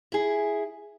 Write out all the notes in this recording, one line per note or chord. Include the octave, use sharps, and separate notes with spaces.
E4 G#4